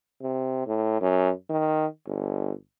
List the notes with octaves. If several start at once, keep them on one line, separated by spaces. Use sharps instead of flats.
C3
A2
F#2
D#3
G1